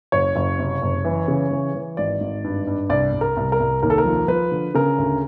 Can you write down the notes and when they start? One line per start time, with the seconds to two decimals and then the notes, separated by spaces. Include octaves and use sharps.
0.12 F#1 C#5
0.36 F#1
0.59 C3
0.82 F#1
1.05 E3
1.28 C#3
1.51 E3
1.75 E3
1.97 G#1 D5
2.20 G#1
2.44 G2
2.67 G2
2.90 C2 D5
3.13 C2
3.21 A#4
3.37 C2
3.52 A#4
3.60 C2
3.83 D#2 A#4
3.90 A4
3.98 A#4
4.05 F3
4.28 F3 B4
4.51 D3
4.74 C#3 A#4
4.99 D2